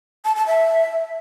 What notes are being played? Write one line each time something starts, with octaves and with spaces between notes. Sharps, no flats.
A5
A5
E5